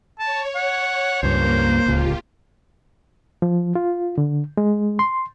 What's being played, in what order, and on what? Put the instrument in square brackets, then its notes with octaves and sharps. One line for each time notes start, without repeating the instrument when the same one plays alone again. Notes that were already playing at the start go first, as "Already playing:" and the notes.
[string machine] C#5 [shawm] A5
[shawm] F#5
[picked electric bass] C#2 G2 [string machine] A#3 [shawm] C5
[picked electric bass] D1 C#2 [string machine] F4 G4
[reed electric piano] F3
F4
D3
G#3
C6